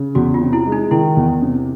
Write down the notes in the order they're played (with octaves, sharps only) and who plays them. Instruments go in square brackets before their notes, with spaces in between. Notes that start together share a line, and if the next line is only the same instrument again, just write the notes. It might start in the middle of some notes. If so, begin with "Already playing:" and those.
Already playing: [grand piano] C#3
[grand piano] E2 [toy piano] F#4
[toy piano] F4
[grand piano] C3
[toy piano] E4
[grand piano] G#3
[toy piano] D#4
[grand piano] D#3 [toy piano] E4
[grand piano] E2
C3